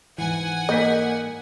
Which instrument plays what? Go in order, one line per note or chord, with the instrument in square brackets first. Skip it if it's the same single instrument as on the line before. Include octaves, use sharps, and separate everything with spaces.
[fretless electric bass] G#2 E3 [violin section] F#5 G#5
[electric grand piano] A#3 G6 B6 [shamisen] D#5